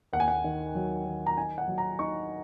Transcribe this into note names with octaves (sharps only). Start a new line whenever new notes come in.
D#2 F#5
G#5
F#5
D#3
F#3
D#3
A#5
D#4 G#5
F#5
F#3
A#5
D#4 C#6